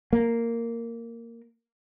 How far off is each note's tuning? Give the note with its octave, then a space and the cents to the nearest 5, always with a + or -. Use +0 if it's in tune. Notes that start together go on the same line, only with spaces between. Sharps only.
A#3 -10